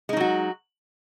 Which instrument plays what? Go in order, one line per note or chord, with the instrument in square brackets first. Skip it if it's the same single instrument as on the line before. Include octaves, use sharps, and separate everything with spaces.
[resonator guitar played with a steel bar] G#3
D#4
F#3
F#4